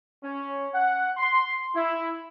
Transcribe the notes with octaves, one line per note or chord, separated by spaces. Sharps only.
C#4
F#5
C6
E4